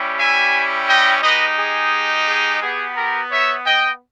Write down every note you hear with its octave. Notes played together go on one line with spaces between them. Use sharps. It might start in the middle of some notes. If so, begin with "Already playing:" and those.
Already playing: G3 C#4 E4 G4
E5 G#5
D#5 G5
G#3 D#4 G4 B4 D#5
G#4
G#4
B3 G4 G#4
G4 A#4
C#5 E5
D#5 G5